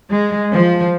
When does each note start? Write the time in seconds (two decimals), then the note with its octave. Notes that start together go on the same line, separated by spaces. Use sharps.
0.11 G#3
0.53 F3